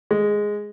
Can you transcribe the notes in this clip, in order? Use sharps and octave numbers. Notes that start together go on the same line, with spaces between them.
G#3